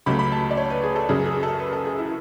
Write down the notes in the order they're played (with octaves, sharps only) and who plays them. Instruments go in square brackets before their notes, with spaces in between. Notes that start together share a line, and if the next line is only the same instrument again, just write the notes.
[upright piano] C#2 C#3 F#3 A3 B5
B5
A5
D5
C#5
B4
G#4
A4
F#2 C#3 F#3 G#4
G#4
A4
B4
A4
G#4
E4